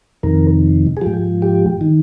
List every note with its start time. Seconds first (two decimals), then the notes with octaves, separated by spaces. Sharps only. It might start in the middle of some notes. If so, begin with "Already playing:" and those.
0.23 F2 C3 D#3 A#4
0.97 G#4
1.01 G#2 F3 G4
1.42 G4
1.81 D#3